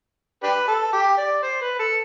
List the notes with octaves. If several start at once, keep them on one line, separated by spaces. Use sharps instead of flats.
D4 G4 B4
A4
G4
D5
C5
B4
A4